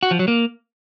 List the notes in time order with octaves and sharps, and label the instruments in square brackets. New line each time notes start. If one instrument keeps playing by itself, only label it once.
[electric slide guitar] F#4
F3
F#3
A#3